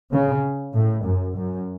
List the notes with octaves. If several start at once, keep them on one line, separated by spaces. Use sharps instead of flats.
C#3
A2
F#2
F#2